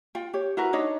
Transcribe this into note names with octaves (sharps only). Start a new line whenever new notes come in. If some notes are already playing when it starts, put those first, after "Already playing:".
F4 G5
G4 C#5
E4 F#4 A#4 B4
D4 D#4 C#5 D#5